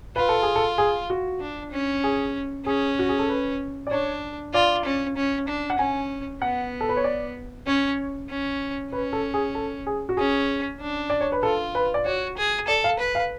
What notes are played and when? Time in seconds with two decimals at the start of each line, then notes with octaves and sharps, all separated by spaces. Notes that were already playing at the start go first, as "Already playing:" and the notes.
0.16 F4 B4
0.29 A4
0.42 G#4
0.56 A4
0.78 G#4
1.10 F#4
1.41 D4
1.72 C#4
2.04 G#4
2.66 C#4 G#4
2.99 F#4
3.09 G#4
3.19 A4
3.29 B4
3.87 D5
3.91 D4 C#5
4.54 F4 D5
4.85 C#4
5.16 C#4
5.48 D4
5.70 F#5
5.79 C#4 G#5
6.42 B3 F#5
6.81 A4
6.89 B4
6.97 C#5
7.04 D5
7.67 C#4 C#5
8.29 C#4
8.92 C#4 B4
9.13 A4
9.34 G#4
9.55 A4
9.87 G#4
10.09 F#4
10.17 C#4 G#4
10.80 D4
11.10 D5
11.21 C#5
11.32 B4
11.43 F4 A4
11.75 B4
11.94 D5
12.05 F#4 C#5
12.37 G#4
12.68 A4 D5
12.84 F5
12.99 B4
13.15 F5